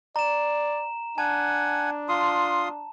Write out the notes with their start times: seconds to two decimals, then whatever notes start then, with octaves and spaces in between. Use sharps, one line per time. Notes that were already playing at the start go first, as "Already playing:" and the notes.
0.16 D5 A#5 E7
1.18 D4 F#5 G#5 A5
2.09 F4 C6 D#6